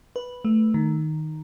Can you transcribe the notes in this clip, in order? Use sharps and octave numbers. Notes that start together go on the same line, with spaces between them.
B4
A3
D#3